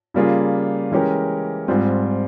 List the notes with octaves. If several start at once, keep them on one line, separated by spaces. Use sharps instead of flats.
C#3 G3 A#3 F4 G#4
E3 G#3 C#4 G4 A#4
G#2 G3 C4 F4